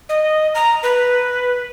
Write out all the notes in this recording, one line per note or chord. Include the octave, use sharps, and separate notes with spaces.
D#5
A#5
B4